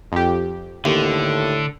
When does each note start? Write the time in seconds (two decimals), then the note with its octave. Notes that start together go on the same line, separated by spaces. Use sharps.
0.12 F2 G4
0.85 D#2 A2 D3